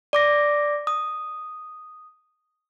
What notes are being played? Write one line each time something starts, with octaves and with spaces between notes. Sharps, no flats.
D5 D6 A#6
D#6